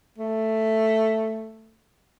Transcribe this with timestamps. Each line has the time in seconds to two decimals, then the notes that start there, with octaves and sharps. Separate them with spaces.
0.18 A3